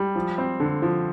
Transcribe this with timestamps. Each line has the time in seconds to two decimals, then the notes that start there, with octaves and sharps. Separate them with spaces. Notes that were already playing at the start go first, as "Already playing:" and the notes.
Already playing: G3
0.15 F3
0.38 C4
0.60 D3
0.82 F3